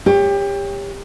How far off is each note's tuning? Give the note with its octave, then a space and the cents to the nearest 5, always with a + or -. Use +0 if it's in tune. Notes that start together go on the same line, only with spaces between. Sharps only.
G4 +25 C#5 +5